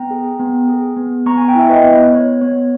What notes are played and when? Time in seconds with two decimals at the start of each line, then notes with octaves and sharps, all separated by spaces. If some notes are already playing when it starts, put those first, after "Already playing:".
Already playing: B3 G5 A#5
0.11 G#4
0.40 B3
0.68 G#4
0.97 B3
1.26 B3 A#5 C#6
1.38 G#5
1.48 G5
1.55 E4 E5
1.70 B4 D#5
1.84 B3
2.13 B3 C#5
2.42 B3 C#5